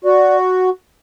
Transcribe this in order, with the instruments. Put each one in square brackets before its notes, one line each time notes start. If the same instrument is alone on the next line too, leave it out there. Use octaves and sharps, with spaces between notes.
[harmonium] F#4 [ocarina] D5